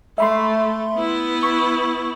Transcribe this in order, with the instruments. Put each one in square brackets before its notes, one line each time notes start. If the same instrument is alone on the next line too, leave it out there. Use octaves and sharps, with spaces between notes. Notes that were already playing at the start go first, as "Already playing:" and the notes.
[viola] A3 [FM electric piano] E5 B5 C6
[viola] B3 E4
[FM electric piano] C#6